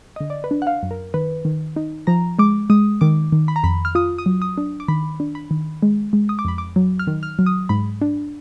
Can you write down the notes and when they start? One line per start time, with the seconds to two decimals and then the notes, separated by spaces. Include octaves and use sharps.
0.16 D3 D#5
0.30 D5
0.44 B4
0.51 D4
0.62 F#5
0.67 F5
0.83 F#2
0.91 A#4
1.14 D#3 B4
1.45 D#3
1.76 D#4
2.07 F3 A#5
2.39 G#3 D6
2.70 G#3 D#6
3.01 D#3 D6
3.32 D#3
3.48 B5
3.56 A#5
3.64 F2 B5
3.85 F6
3.95 F4 D#6
4.18 D#6
4.26 F#3
4.42 D#6
4.57 D4
4.80 D6
4.88 D#3 B5
5.20 D4
5.35 B5
5.51 D#3
5.83 G#3
6.13 G#3
6.29 D#6
6.39 D6
6.45 F2 B5
6.58 D6
6.76 F#3
6.99 F6
7.07 D#3
7.23 F6
7.39 F#3
7.46 D#6
7.69 G#2 B5
8.02 D4